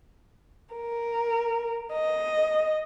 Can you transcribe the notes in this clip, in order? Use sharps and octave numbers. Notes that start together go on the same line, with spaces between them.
A#4
D#5